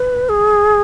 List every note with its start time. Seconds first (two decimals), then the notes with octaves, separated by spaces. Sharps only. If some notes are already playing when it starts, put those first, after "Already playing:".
Already playing: B4
0.29 G#4